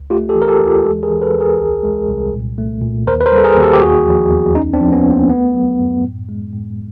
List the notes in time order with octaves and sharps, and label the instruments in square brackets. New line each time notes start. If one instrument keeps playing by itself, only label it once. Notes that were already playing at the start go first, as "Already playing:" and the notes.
Already playing: [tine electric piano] C#2
A3 F4 G4
G4 A4
E3
A#4
G4 A4
D#2
F4 G4
G#3 G4 A4
G#4 A#4
E3
A4 B4
D#2
G#4 A#4
C2
G#3
C2
A#2
A3
A#2
D#2 A#4 C5
B4
A#4 C5
G3
A4
G#4 A#4
D#2
G4 A4
G4
E2 F#4 G#4
F3
E2
D2 C#4 D#4
C4 D4
F3
B3 C#4
D2
A#3 C4
A3 B3
F#3
F#2
A2
G#3
A2